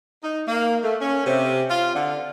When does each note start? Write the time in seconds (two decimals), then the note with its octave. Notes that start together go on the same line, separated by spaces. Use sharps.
0.24 D#4
0.47 A#3
0.84 A3
1.01 C#4
1.26 C3
1.70 F4
1.95 D3